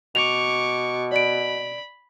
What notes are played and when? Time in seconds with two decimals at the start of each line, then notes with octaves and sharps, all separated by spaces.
0.15 B2 C#6 D6 F7
1.12 D5 B5 D7